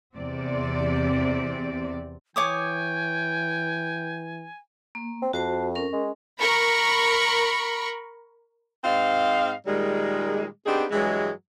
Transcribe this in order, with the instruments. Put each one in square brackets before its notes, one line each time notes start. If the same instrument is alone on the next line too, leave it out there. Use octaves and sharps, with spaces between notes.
[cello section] E2 C3 C4 D5
[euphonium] E3 [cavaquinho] C#5 D6 D#6 [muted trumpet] G5 [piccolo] G#5
[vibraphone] A#3
[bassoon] C4
[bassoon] F2 [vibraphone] F#4 C5 A5
[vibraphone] C#4 A#4
[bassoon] G#3
[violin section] A#4 B5 C#6
[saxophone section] G#2 C4 D#5 F5
A#2 D#3 G3 G#3
B3 C4 D4 D#4 G4 G#4
G2 E3 F#3 G#3